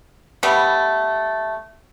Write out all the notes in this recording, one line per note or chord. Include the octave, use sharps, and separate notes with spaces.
G3 A3 B3